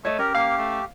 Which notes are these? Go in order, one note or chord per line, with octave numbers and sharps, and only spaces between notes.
A3 C#5 D#5
C#4 G4 A#4
A#3 F5
A3